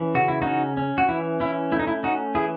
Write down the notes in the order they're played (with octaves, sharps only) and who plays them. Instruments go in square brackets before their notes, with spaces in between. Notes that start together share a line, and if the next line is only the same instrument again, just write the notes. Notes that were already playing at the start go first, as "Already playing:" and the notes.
Already playing: [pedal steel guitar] E3 C#4
C#3 F#4
E4
C#4 D#4 F#4
C#4
F#4
E3 E4
C#4 E4
A3 E4
D#4
E4
C#4 D#4 F#4
E3 E4 G#4